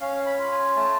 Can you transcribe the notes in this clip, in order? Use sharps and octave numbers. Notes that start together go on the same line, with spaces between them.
C#4 F5
B5
F4
G#5
A3 A5